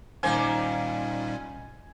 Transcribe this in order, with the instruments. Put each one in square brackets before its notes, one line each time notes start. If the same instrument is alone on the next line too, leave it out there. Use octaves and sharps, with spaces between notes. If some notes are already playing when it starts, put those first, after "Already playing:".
[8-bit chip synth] A#2 G3 C#4 [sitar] D#3 A#3 C5 [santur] G#5